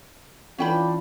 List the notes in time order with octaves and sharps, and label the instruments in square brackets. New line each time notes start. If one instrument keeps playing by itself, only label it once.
[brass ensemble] E3 D4 F4 [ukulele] C#4 G5 B5